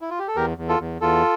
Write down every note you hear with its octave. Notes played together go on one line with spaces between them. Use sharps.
E4
F4
G4
A4
E2 G4 A#4
E2
F4 A4
E2
E2 F4 A4